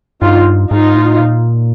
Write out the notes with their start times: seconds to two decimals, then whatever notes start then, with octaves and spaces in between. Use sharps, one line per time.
0.21 G2 D#4 F4
0.70 G#2 D#4 F4
0.95 A2
1.20 A#2